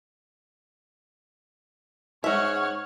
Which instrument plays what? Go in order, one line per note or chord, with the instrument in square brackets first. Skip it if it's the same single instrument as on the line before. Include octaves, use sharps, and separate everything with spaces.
[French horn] G#2 [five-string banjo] G#3 E5 [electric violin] C#5 F#5 [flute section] C#6 F6